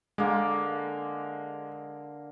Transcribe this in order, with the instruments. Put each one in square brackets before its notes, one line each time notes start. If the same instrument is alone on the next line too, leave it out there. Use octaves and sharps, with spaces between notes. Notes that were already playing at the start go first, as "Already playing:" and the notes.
[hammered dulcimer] D3 A#3 [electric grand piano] G#3